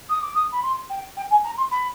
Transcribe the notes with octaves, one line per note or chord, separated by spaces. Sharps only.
D#6
D6
D#6
B5
C6
G5
G5
G#5
A#5
C6
B5